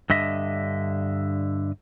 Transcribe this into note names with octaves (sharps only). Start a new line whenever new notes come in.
G2 D3 D#5 E5